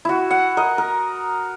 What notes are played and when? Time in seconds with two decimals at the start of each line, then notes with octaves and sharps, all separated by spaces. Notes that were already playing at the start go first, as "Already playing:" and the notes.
0.05 E4 F#4
0.31 F#5
0.57 A#4 D#5
0.78 A#4